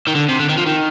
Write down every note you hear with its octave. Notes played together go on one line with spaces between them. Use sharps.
D#3
D3
C3
D3
D#3
F3
D#3